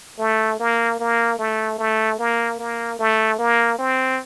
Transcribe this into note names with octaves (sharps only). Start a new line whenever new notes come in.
A3
A#3
A#3
A3
A3
A#3
A#3
A3
A#3
C4